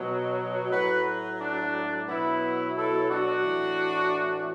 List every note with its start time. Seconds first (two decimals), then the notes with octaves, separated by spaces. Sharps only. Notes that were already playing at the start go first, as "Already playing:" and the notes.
Already playing: B2 F#3
0.71 A2 F#3 F#4 B4
1.39 D4
2.07 B2 F#3 B3 E4
2.75 E4 A4
3.08 D4 F#4
3.43 A2 E3